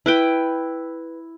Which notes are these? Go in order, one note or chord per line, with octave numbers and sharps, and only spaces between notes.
E4 B4 G5